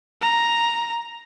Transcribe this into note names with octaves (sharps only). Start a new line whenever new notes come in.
A#5